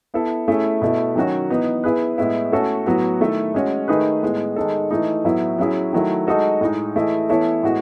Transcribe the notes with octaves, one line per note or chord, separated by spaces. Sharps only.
B3 E4 A4
A3 C#4 E4 G#4
B2 A3 E4
D#3 F#3 C#4 F#4
E3 B3 D#4
B3 E4 G#4 B4
A2 G#3 B3 E4
A3 C#4 F#4 A4
A2 F#3 B3 F#4
D#3 A3 E4 A4
G#3 C#4 F#4
D#3 A3 D#4 G#4 B4
A2 G#3 B3
D#3 G#3 D#4 A4
E3 A3 D#4
A2 F#3 B3 E4
F#3 C#4 E4 G#4
D#3 F#3 A3 E4
G#3 D#4 F#4 A4 D#5
A2 G#3 D#4
E3 A3 E4 G#4 D#5
E3 B3 E4 A4 C#5
A2 G#3 B3 F#4